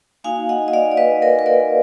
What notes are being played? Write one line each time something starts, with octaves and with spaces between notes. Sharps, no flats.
A#3 D#4 F#4 F5 G#5
D#5 F#5
D#5
D5 F5
D5
B4 D#5
A#4 D5
B4
A#4 D5